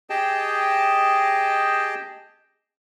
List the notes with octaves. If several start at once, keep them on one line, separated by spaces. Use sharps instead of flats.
G4 G#4 D#5 G5 A5